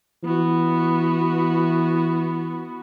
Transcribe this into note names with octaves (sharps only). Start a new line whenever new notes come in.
E3 B3 F#4